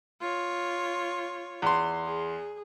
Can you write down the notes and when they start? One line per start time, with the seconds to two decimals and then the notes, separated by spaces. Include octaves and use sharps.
0.20 F4 C#5
1.62 E2 C6
2.04 G#4